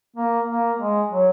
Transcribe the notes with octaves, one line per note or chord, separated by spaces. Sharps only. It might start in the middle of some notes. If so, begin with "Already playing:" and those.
A#3
A#3
G#3
F#3